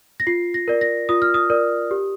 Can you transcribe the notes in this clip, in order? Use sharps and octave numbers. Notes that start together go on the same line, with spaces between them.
A#6
F4 C7
A#6
A#4 D5
A#6
F4 D#6
F6
D#6
A#4 D5
G4